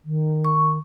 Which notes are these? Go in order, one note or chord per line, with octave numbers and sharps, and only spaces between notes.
D#3
C#6